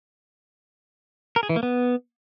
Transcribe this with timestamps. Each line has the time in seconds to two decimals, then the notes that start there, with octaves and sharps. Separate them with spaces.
1.36 A#4
1.43 G#4
1.49 E3
1.56 A#3
1.63 B3